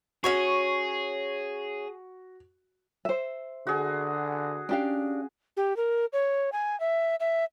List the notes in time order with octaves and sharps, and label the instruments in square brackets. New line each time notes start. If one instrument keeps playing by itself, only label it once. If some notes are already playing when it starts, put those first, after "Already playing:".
[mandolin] C#4 C#5 C#6 [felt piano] F#4 [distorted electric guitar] G#4
[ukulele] C5 E5
[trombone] D3 [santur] F#4 G#4
[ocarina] C#4 [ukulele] D4 G4 F5
[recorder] G4
A#4
C#5
G#5
E5
E5